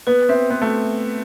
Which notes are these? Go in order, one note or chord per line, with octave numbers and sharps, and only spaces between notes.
B3 B4
C4 E5
B3 C6
A3